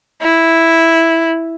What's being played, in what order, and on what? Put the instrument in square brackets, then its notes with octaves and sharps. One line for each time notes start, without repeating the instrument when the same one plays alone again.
[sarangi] E4